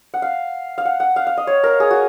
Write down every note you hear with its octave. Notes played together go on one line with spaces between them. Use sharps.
F#5
F5
F5
F#5
F#5
F5
F5
D#5
C#5
A#4
G#4
F#4